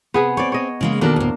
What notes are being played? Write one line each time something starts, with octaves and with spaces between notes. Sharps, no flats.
C3 B3 G#4 B4
C4 C#5 D5
C#5 D#5
C#3 G#3 A#3
B2 D#3 A#3 D4 A4 A#4
D2 A2